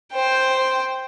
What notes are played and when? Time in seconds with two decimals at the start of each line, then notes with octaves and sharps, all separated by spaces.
0.13 C5 G5